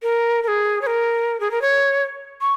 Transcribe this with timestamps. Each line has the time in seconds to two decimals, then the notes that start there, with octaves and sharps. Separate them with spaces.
0.02 A#4
0.43 A#4
0.48 G#4
0.82 C#5
0.87 A#4
1.40 G#4
1.51 A#4
1.62 C#5
2.41 C#6